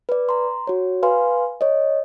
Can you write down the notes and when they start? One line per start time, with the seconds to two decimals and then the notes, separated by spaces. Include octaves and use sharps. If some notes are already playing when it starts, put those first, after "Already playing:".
0.09 B4 D5
0.29 A#5 C6
0.67 F#4 C#5
1.03 B4 F5 G#5 C6
1.61 C#5 D#5